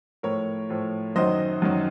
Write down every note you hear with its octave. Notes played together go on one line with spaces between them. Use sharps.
A2 F3 A#4 C#5
A2 F3
F#2 D#3 F#3 C5 D#5
F#2 D#3 F#3